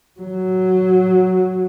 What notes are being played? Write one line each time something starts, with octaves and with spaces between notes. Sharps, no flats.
F#3